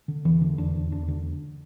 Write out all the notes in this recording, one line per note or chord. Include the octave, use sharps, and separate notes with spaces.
D3
E2 E3
D3
E2 D4
E2
E2 D4
D3